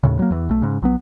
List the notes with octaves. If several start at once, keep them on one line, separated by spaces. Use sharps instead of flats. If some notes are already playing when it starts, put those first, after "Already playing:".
D#2 A2 C#3
F#3 A#3
E2 E3
B1 A3
G#2 C#3
A#1 F#3 B3